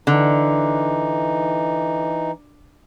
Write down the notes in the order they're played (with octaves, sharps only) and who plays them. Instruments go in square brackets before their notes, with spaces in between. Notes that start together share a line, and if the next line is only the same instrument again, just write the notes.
[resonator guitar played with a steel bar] D3 [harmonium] E3 D#4